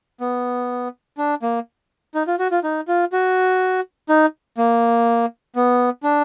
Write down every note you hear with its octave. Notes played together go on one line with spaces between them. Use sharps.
B3
D4
A#3
D#4
F4
F#4
F4
D#4
F4
F#4
D#4
A#3
B3
D4